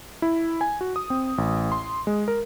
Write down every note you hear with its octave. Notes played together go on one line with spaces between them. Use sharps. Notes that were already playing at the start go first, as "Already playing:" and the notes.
E4
G#5
F#4
D#6
C4
A1
C6
G#3
A#4